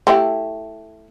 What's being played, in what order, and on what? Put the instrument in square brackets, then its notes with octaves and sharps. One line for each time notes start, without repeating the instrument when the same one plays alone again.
[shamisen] A3 E4 G4